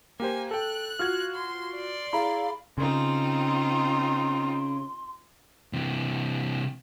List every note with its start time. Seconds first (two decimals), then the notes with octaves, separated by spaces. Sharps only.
0.20 A#3 G4 C5 G#5
0.51 A4 G5 F#6
0.99 F4 F#4 F6 G#6
1.34 C6
1.75 D5 C6
2.13 E4 G#4 F5 A#5 B5
2.78 C#3 C4 D#4 F4 C6
5.73 C3 E3